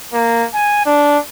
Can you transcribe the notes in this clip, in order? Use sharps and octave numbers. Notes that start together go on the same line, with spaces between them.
A#3
G#5
D4